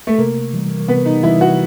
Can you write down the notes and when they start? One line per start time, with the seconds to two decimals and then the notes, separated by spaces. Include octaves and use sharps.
0.07 A3
0.18 C3 A#3
0.54 E3 G3
0.88 C3 B3
1.06 D#4
1.23 E3 G3 E4
1.41 F#4